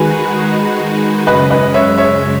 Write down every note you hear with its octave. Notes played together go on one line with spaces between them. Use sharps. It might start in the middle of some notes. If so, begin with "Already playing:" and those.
Already playing: D#3 G#3 D#4 F#4 G#4 B4
F#2 C#3 G#3 B4 D#5
B4 D#5
C#5 E5
C#5 E5